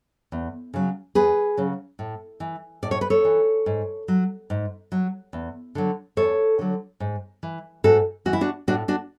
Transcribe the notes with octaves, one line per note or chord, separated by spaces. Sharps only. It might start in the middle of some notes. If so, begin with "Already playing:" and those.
E2
C#3 F#3
E2 G#4 B4
C#3 F#3
A2
E3
A2 D5
C#5
B4
A4 C#5
E3
G#2
F#3
G#2
F#3
E2
D3 F#3
E2 A4 C#5
D3 F#3
G#2
E3
G#2 F#4 A4
E3 F#4
E4
D4 F#4
A2 D4 F#4
D4 F#4